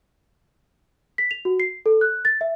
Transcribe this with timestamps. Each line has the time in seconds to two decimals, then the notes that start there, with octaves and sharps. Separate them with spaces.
1.18 B6
1.31 F7
1.45 F#4
1.60 C7
1.86 A4
2.01 F#6
2.25 A6
2.41 E5